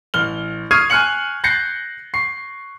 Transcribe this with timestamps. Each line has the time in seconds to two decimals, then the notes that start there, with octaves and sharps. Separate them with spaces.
0.14 A1 F6 G7
0.71 C#6 D#6 F6 G#6 C7 D#7
0.90 G#5 C#6 F6 F#6 C#7 F#7
1.44 F#6 G6 A6 A#6 C7 C#7
2.14 C#6 C7